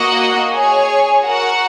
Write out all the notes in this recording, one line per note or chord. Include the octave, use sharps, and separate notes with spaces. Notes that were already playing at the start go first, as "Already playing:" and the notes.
Already playing: A#3 F#4 D#5 F#5
G#4 C#5 G#5
F#4 A#4 F#5